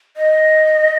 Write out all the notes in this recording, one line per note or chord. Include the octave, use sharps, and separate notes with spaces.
D#5